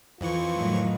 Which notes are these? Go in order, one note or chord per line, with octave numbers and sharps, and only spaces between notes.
F2 E3 F4 C#6
A2 D#3 F#3